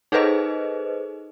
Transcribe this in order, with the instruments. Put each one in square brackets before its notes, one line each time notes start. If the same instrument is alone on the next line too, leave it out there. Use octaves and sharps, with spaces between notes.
[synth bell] D#4 G#4 A4 B4 C5 D#5